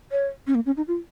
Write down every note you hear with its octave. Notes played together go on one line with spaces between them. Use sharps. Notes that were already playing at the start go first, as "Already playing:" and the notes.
C#5
C#4
A#3
C#4
D#4
F4